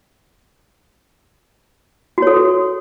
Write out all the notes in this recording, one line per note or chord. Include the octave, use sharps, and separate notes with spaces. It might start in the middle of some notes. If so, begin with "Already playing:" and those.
F#4 A4 C#5